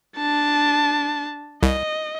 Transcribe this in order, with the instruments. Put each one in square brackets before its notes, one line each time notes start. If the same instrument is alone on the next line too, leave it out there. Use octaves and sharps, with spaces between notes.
[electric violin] D4 A5
[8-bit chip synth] C2 [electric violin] D#5